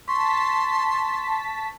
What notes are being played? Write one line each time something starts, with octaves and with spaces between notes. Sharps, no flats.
A5 C6 C#6 B6